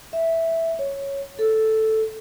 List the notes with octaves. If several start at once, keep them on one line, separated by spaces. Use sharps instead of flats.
E5
C#5
A4